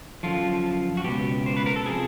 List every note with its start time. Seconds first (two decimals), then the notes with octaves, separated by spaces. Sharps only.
0.23 F#2 D3 F3 F4
0.97 F#4
1.04 C#2 B2 G4
1.46 C5
1.57 B4
1.66 A#4
1.76 A4
1.86 C3 F3 G#4